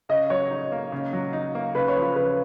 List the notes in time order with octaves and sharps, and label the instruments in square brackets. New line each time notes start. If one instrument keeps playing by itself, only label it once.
[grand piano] C#3 [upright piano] D#5
[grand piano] F#3 [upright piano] C#5
[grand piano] D#4
A#3
C#3
F#3
D#4
A#3
[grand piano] C#3 [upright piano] B4
[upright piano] C#5
[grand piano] F3
[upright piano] B4
[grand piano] C#3 [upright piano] B4